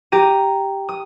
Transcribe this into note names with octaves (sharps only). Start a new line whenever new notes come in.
G4 A#5 D#7
D#6